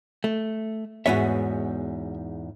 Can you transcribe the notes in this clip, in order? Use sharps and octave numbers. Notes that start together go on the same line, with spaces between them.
A3
E2 G#2 B3 F#4 C#5 E5